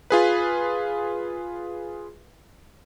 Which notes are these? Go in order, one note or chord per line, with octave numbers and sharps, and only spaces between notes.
F4 G#4 B4